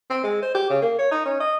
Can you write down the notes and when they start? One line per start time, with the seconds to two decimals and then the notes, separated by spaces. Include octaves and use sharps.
0.10 C4
0.23 G#3
0.42 C5
0.55 G4
0.70 C#3
0.82 A#3
0.98 C#5
1.11 D#4
1.26 C#4
1.40 D#5